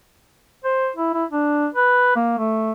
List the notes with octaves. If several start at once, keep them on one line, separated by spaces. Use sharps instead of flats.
C5
E4
E4
D4
B4
A#3
A3